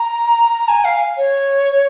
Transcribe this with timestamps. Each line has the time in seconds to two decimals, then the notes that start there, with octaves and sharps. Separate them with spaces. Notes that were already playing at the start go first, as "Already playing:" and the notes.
Already playing: A#5
0.68 G#5
0.85 F5
1.17 C#5